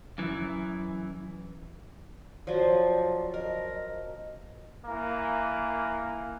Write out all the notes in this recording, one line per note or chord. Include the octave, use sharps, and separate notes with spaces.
F#2 E3
F3 F#3 C5 D5
A#4 D#5
E3 A#3